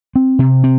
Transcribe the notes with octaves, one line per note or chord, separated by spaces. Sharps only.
C4
C3
C4